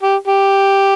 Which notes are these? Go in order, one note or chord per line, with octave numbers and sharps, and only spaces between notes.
G4
G4